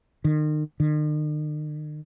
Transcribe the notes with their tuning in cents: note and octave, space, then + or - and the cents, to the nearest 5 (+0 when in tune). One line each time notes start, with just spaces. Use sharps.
D#3 -35
D#3 -45